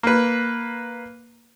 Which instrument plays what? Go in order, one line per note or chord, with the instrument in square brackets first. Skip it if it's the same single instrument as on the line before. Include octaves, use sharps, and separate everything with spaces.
[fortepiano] A#3 B4